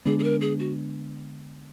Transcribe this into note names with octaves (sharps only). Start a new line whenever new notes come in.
D3 G#3 B3 D4 G#4
G#4
A#4
G#4
F#4